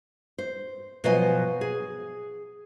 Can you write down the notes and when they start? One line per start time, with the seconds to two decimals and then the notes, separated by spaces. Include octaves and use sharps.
0.38 C5
1.04 B2 F3 F#3 C5 D#5 G#5
1.61 G#4